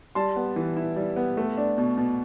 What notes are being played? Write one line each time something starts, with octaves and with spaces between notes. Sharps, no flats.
G3 A5 C6
B3
E3
E4
G3
B3
A3
D4
B2
B2